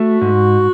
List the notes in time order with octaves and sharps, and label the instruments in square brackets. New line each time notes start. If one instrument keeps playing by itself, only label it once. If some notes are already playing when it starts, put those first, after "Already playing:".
Already playing: [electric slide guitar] A3 [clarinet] F#4
[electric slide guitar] G#2